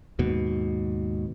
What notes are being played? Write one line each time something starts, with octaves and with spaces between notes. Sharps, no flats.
D#2 G#2 B2